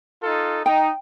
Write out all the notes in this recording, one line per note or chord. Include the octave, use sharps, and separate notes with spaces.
D#4 F4 A4
D#4 G5